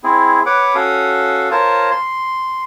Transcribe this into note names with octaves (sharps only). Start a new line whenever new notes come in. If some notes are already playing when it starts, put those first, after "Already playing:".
C4 E4 G#4
B4 C#5 F#5 D6
C#4 F#4 A4 F5 D#6
F4 A#4 C5 C#5 A5
C6